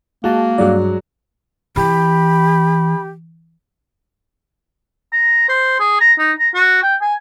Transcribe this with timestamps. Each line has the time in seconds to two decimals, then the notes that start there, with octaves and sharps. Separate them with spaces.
0.24 G#3 A#3 F#4 A5
0.58 G2 F#3 G#3 F#4 D5
1.76 E3 G4 B5
5.13 A#5
5.49 C5
5.80 G#4
6.01 A#5
6.19 D#4
6.39 A#5
6.54 F#4
6.83 G5
7.02 G#5